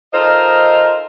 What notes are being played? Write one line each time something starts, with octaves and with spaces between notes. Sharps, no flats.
D#4 F4 A4 A#4 C5 D#5